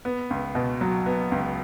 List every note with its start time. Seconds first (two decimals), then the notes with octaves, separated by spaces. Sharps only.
0.05 B3
0.30 C#2
0.55 B2
0.81 F#3
1.06 B3
1.32 C#2